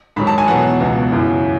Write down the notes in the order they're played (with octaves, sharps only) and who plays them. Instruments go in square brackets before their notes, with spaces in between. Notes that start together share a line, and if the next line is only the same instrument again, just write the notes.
[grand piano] G#2 D#3 F#3 B5
A5
G#5
E2 B2 F#3 F#5
C#2 B2 F#3
F#2 C#3 E3